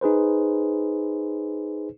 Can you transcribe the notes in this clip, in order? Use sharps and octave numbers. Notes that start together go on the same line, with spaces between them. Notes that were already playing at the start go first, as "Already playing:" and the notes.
D#4 G#4 B4 C5